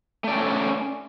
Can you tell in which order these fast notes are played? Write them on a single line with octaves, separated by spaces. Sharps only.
A3 D5 C#4